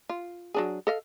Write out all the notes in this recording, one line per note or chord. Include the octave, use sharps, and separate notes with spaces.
F4
F#3 D4 G#4
A4 D#5 F5